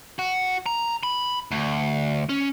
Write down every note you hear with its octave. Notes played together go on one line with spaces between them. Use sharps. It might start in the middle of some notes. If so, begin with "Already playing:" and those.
F#4
A#5
B5
D2
C#4